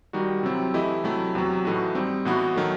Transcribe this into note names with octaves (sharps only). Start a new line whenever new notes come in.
D#3 G3 D#4 F#4
C3 F#3 C4 E4
E3 A3 E4 G4 D#5
C3 F#3 A3 E4
E2 C3 F#3
A2 E3 A3 D#4 F#4
G3 C4 D#4
A2 E3 B3 D#4 F#4
D#3 F#3 A3